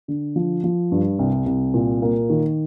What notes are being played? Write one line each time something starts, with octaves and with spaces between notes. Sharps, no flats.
D3
F3
F3
G2
C2
C2
A#2
A#3
D#3